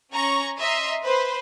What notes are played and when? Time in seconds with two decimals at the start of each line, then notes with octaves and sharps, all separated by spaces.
0.14 C#4 A#5 C#6
0.59 D#5 E5 A#5 C6
1.04 B4 C5